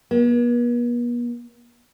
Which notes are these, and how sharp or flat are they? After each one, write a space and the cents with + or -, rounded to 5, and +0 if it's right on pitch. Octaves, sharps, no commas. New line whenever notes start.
B3 -45